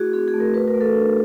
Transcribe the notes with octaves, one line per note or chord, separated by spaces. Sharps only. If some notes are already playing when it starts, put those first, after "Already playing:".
Already playing: A3 E4 F#4 G#4
C4 G#4
G#4
A3
A#4
F#4 B4
A#4
A3
A4
D4